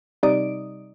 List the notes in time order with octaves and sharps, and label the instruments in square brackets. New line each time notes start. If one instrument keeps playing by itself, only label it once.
[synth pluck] C3 G3 D#4 D5 D#6 D7